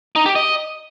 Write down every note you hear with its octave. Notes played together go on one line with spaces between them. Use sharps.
D#4
G4
D#5